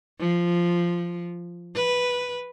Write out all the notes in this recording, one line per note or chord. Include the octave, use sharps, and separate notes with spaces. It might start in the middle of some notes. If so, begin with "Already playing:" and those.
F3
B4